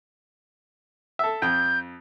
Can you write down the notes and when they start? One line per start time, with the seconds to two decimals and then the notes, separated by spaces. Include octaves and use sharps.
1.19 A4 E5
1.42 F2 G6